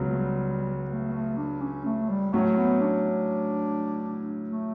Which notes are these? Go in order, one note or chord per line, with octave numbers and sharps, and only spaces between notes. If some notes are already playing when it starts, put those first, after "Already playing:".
Already playing: C#2 C#3 F#3 B3
A3
G3
A3
A3
D4
C#4
A3
G3
A2 F#3 A3 C#4
B3
D4
A3